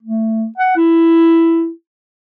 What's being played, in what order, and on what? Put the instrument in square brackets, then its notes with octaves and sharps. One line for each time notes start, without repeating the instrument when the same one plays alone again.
[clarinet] A3
F#5
E4